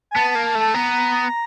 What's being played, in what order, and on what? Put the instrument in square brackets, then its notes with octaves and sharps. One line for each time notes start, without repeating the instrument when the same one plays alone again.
[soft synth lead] G#5
[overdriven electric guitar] B3 [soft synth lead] A5
[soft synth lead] A5
[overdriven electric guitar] A#3
[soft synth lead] A5
[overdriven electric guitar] A3 [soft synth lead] A5
[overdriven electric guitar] B3 [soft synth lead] A#5